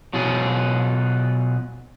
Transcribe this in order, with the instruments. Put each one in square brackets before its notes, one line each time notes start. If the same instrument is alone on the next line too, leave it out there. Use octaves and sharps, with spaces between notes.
[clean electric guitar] B2 F#3 F4 G#4